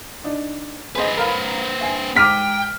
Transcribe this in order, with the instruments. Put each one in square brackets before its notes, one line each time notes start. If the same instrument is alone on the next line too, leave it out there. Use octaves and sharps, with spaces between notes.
[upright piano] D4 D#4
[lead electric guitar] C4 B4 [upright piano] G#4 C5 D#5
[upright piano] A#4 F5 B5
E5 G#5 C7
[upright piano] G#2 G#3 D#7 [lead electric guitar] G5 [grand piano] D6 F6 B6